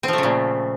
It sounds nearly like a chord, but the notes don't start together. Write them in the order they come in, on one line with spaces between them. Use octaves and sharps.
C4 F3 A3 C#3 A#2